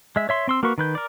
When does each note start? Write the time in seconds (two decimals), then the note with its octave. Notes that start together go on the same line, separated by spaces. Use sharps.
0.16 G#3 E5
0.29 C#5 E5 C6
0.48 C4 C6 E6
0.63 A#3 F#4 A#4 B4 C#6
0.78 D#3 B4 G6
0.95 A#4 D5